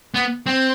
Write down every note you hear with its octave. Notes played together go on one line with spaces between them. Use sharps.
B3
C4